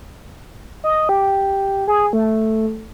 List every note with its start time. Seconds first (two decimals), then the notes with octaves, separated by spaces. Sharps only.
0.84 D#5
1.09 G4
1.88 G#4
2.13 A3